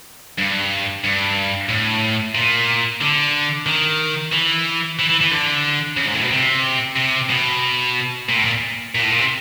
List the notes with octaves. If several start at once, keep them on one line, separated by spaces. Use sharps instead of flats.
G2
G2
A2
A#2
D3
D#3
E3
E3
E3
E3
D3
C#3
G#2
A2
B2
C3
C3
B2
A#2
A2
A#2
A#2
A2
A#2
C3